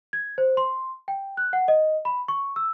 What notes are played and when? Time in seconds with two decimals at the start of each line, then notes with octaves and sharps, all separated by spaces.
0.13 G#6
0.38 C5
0.57 C6
1.08 G5
1.37 F#6
1.53 F#5
1.68 D#5
2.05 B5
2.28 C#6
2.56 E6